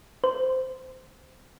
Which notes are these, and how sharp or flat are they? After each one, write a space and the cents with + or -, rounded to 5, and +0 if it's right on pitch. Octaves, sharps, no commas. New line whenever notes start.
C5 -15